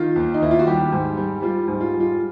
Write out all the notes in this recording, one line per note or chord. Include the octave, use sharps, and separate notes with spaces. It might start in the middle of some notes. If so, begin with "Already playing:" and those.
Already playing: D#3 F4
D#2
D#4
D#2 E4
F4
F#4
G3 G4
G#2
G3
G3 F4
G#2
F4
G3
F4